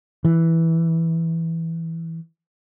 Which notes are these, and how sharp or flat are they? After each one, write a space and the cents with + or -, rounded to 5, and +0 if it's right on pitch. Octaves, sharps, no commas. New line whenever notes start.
E3 -5